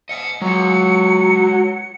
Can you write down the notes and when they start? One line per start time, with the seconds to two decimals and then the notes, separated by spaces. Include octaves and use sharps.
0.09 D#5 F#5 C#7
0.42 F#3 G#3 F4